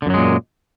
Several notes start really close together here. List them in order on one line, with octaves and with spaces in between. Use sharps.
D3 F#2 F#3 G#3 A#2